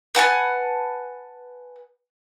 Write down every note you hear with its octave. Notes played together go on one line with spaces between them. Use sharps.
B4 F#5 G#5 A5